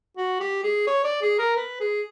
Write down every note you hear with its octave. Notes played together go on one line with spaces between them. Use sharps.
F#4
G4
G#4
C#5
D5
G#4
A#4
B4
G#4